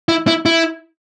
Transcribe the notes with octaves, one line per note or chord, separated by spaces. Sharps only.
E4
E4
E4